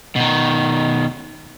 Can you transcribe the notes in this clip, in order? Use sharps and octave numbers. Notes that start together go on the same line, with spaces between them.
B2 D#3